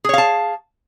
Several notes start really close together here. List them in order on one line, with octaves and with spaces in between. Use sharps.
G#4 C#5 F5 A5